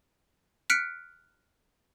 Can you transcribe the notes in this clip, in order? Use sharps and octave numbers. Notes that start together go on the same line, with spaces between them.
F6 F#6 B6 C#7 D7